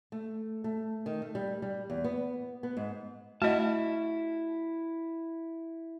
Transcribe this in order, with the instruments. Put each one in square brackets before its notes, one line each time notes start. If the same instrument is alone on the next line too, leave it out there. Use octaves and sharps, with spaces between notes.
[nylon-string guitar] A3
A3
D#3
A3
G3
G3
E2
B3
B3
G#2
[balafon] A3 D#5 [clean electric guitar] E4 A5 [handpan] F#4